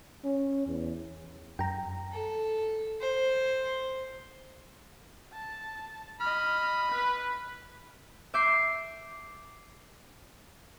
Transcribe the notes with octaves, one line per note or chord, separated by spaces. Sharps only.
C#4
E2
F#2 G5 A#5
A4
C5
A5
D#5 B5 F6
B4
E5 D6 G6 C7